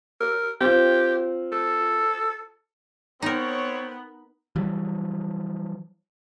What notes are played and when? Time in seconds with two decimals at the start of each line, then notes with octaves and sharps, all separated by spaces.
0.21 A#4
0.61 C4 F4 G4
1.52 A4
3.22 B3 C4 D#4 A#4 C#5
4.56 E3 F#3 G3